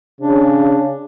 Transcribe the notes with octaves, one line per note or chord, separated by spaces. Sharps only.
C#3 D4